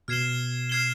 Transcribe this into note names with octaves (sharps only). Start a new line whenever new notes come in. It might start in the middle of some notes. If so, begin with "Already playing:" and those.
B2 F6 G#6 C7 E7 G7
F6 G#6 C7 E7 G7